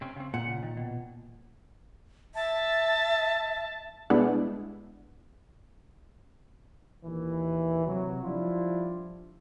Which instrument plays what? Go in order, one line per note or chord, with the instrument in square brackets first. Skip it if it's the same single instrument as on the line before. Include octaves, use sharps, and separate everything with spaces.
[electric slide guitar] C3 C4 C#4
C#3 C4
[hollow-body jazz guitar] A#2 [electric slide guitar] F#5
[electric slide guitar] C#3
D#3
B2
[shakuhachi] E5 [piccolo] A5
[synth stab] B2 G3 G#3 B3 D4 E4
[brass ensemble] D#2 A#2 E3
C3 F#3
F3 G3 D4 E4 F4